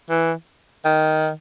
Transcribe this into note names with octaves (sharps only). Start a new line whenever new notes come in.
E3
D#3